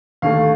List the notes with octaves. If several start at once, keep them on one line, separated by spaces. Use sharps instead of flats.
D#2 D3 A3 F5